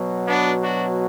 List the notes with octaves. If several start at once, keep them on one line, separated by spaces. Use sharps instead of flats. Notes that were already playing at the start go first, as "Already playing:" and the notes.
Already playing: B2 F#3
B3 D4
D4 F#4